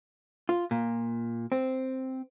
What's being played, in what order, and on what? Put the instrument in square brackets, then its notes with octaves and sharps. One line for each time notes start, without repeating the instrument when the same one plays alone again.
[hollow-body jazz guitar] F4
A#2
C4